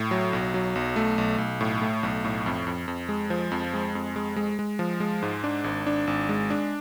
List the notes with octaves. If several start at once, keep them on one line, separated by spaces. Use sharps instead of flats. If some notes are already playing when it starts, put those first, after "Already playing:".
Already playing: A2
F#3
B1
F#3
B1
A3
B1
B1
A2
A3
B1
A2
F2
F2
F2
G#3
F3
F2
G#3
F2
G#3
G#3
G#3
F3
G#3
G#2
D4
G#1
D4
G#1
G#3
D4